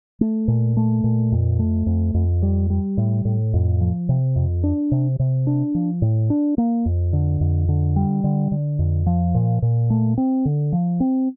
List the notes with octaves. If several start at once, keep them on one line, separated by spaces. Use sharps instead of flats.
A3
A#2
A3
A#2
F2
A3
F2
F2
G3
G3
A2
A2
F2
F3
C3
F2
D4
C3
C3
D4
F3
A2
D4
A#3
F2
D3
F2
D3
G3
D3
D3
F2
F3
A#2
A#2
A3
C4
D3
F3
C4